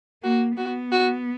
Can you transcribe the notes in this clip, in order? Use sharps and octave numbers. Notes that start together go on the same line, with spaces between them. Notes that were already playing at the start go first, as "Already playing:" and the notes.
A#3 F#4
B3 F#4
F#4